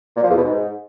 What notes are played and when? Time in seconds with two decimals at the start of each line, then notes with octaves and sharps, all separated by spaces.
0.17 A#2
0.23 F3
0.30 E2
0.37 B2
0.44 G#2